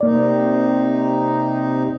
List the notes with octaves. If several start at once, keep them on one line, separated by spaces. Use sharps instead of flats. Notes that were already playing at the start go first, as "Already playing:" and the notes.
C3 A#3 D#4 D5